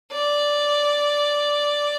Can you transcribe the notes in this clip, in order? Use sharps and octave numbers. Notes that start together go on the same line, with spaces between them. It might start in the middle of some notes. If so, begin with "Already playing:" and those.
D5